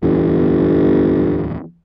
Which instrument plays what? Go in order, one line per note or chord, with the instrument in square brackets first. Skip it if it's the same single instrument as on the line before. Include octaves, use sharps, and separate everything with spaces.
[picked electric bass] D1 E2 E3 [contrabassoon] G1